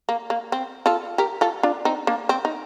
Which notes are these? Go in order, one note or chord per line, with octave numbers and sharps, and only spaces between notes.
A#3
A#3
C4
F4 A4
G4 A#4
F4 A4
D4 F4
C4 D#4
A#3 D4
C4
D#4